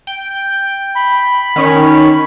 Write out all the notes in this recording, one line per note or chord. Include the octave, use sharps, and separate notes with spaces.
G5
B5
D#3 C#4 C#5